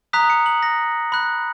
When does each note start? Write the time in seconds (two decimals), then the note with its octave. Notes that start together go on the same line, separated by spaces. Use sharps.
0.13 A#5 D#6 F#6 B6
0.30 C#7
0.46 F#7
0.63 A#6
1.12 B5 F#6